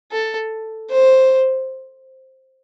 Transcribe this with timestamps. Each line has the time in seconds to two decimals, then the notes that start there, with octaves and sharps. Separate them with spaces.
0.12 A4
0.90 C5